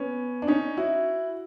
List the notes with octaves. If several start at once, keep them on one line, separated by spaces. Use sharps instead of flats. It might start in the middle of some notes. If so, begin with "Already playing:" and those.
Already playing: B3 C#4
D4
C#4 D#4
E4 F#4